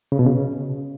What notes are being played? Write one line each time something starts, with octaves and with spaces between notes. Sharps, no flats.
C#3
B2
C#3